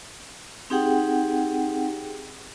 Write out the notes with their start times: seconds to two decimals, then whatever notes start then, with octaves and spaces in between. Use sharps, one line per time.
0.70 C4 D#4 G4 G#4 F#5 G5